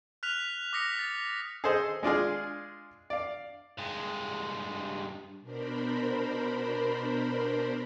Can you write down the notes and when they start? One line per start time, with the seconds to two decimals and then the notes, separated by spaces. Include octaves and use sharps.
0.23 F6 F#6 B6 F7
0.73 D6 D#6 A#6 B6 C#7
0.99 A6
1.64 G#4 A4 C5 D#5
2.03 G#3 D4 F4 G#4
3.10 D5 F5
3.78 G2 G#3
5.41 B2 D4 A#4 C5 B5